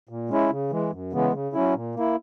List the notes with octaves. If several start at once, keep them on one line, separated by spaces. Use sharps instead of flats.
A#2
G#3 C#4 E4
C#3
E3 G#3
F#2
C#3 E3 G#3 B3
C#3
F#3 C#4 E4
A#2
A#3 E4